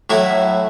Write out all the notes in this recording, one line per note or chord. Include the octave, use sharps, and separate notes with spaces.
A2 F#3 A3 E4